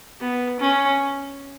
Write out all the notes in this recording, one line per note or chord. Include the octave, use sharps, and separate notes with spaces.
B3
C#4